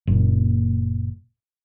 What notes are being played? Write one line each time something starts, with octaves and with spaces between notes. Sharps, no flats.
F#1 A#2